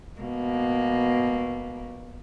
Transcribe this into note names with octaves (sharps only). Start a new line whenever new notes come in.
B2 A#3